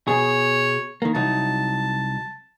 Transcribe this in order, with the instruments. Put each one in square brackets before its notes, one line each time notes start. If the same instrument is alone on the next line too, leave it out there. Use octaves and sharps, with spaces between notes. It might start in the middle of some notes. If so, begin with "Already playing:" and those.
[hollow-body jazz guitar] B2 G#4 [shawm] C#5
[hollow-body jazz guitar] D#3 A#3
[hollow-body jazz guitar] C2 F#3 D#4 [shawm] A5